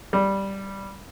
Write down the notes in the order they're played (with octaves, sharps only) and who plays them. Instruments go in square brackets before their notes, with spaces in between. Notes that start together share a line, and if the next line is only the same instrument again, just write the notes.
[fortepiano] G3